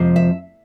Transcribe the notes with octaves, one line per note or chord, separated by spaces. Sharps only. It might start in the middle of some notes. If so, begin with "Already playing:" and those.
Already playing: F2 C3 F3 G#3
E5